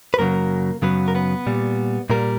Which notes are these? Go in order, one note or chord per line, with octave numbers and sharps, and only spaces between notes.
B4
F#2 C#3 F#3 A#3 A#4
F#2 C#3 F#3 B3 B4
A#4
B3 B4
A#2 G3
A#2 G3 A#3 A#4